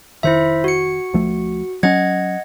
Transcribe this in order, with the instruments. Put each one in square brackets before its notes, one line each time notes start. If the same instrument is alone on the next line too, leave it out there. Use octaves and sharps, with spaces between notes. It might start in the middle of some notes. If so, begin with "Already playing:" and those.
[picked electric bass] F1 D#3 [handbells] E4 C5 E5
[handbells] F#4 C#7
[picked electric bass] D2 F3 A3
[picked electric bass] F#3 C#4 [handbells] D#5 F#5 G#6